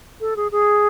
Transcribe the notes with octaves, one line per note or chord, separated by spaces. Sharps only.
A4
G#4
G#4